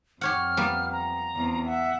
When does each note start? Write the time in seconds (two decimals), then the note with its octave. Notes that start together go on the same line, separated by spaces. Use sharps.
0.21 F2 G4 C#5 F#5 F6
0.57 G3 A#3 B3
0.92 A#5
1.36 E2 C4
1.67 E5 F#5